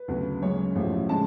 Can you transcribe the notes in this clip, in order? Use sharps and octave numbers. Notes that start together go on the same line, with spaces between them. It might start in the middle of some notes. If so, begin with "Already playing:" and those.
Already playing: B4
D2 C#3 F#3 B3
F#2 C#3 G#3 C#5
A1 A2 F3 A3
C#3 G#3 D4 A5